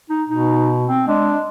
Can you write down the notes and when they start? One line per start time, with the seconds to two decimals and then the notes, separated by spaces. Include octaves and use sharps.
0.09 D#4
0.29 B2 D#4
0.86 C4
1.08 G#3 D4